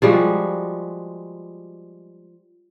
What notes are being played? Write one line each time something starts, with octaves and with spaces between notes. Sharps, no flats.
F3 G3 G#3 F#4